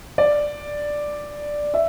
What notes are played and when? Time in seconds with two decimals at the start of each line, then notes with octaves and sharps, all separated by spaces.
0.18 D5
1.74 E5